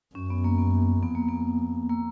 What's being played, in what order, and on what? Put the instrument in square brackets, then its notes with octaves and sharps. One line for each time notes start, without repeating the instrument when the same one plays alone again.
[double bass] F#2 [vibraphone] C#4
[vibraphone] B3
A#3
B3
[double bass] F2 [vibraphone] B3
[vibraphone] A#3
B3
A#3